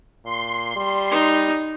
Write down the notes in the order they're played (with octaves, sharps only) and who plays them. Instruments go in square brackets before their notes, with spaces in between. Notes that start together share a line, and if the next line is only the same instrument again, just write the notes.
[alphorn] A#2 [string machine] C6
[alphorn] G3
[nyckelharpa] D#4